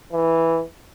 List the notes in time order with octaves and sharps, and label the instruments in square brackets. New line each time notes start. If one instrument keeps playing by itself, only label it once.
[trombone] E3